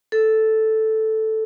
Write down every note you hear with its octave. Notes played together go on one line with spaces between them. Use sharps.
A4